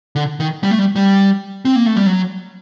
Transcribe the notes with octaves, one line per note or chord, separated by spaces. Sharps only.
D3
D#3
G3
A3
G3
G3
C4
A#3
A3
G3
F#3